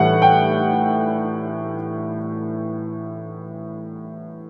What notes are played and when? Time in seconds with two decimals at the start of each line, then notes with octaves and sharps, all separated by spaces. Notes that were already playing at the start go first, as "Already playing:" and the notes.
Already playing: A2 E3 G3 F#5
0.22 G5